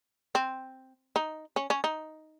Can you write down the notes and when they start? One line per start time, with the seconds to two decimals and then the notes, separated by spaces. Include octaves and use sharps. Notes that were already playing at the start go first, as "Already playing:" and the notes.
0.35 C4
1.16 D#4
1.56 C#4
1.70 C#4
1.84 D#4